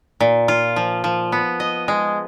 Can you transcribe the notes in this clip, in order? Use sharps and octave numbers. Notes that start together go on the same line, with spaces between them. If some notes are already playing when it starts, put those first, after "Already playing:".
A#2
F4
F3
F3
B3
D#5
G#3